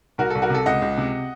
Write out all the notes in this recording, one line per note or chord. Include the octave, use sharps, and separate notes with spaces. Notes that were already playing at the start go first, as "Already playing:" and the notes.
C2 F#4 A#4
C2 A4
F#4 A#4
C3 A4
C#2 D#5 F#5
C#2
C3